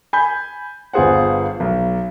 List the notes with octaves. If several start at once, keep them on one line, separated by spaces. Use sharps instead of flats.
G#5 B5 G6
G1 B3 F4 G#4 C5 F#5
B1